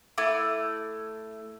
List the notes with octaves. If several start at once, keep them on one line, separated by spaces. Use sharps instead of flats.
A3 E4 D6